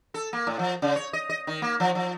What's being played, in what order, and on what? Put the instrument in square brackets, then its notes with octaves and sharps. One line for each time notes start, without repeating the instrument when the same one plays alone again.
[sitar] A4
A#3
A2
F3
C#3
C#5
D#5
D#5
D#3
A#3
F3
F3